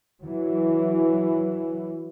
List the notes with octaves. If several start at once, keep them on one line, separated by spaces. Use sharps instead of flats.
E3 F#3